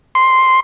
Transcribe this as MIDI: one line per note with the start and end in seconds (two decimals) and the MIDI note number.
0.15 0.60 84